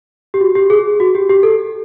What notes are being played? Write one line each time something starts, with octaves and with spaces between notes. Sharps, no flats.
G4
F#4
G4
G#4
F#4
G4
G4
A4